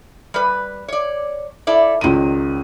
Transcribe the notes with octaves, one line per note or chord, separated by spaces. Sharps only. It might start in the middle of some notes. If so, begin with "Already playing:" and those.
G3 B4
C#5 D5
E4 A4 D5
C#2 G#2 D#3 D#7